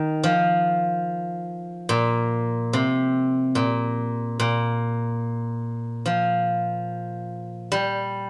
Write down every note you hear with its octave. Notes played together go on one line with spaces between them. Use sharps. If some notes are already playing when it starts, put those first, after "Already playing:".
Already playing: D#3
F3
A#2
C3
A#2
A#2
F3
G3